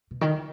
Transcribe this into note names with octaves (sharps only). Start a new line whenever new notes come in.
B2
D#3